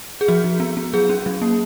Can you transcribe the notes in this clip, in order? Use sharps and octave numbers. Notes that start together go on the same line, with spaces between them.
G#4
F3 F#4
F3
B3
B3
F#3 G#4
C#4
F#3
A#3